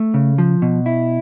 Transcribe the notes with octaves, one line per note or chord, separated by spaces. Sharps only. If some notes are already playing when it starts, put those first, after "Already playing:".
Already playing: A3
C#3
F3
B2
E4